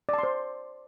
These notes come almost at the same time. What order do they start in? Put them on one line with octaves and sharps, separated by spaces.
D5 A5 C6 C5